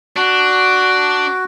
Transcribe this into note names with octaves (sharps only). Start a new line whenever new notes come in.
D4 F#4